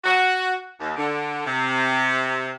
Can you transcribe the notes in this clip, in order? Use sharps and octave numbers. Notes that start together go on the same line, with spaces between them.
F#4
D#2
D3
C3